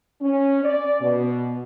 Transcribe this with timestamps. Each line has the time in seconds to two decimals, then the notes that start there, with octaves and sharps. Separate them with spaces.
0.20 C#4
0.64 D5
1.00 B2